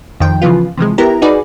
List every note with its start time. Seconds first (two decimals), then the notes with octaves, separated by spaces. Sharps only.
0.20 F2 D#3 F3 G5
0.42 C#3 E3 F3 B3 F4
0.77 C3 E3 F3 G#3
0.98 B3 E4 G4 A#4 A#5
1.22 D#4 F#4 G#4 B4 D5